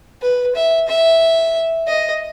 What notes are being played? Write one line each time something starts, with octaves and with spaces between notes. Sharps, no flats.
B4
E5
E5
D#5